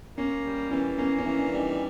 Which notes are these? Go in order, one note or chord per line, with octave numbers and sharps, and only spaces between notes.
A#3 C#4
G3
E3 C#4
A#3 C#4
C#4
E3
D4
G3
D#4